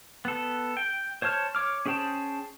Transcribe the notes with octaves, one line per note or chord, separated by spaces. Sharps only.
B3 A4
G5
C5 C#5 A5 F6
C#5 D6 F6
C#4 G#4 C5 G5 A5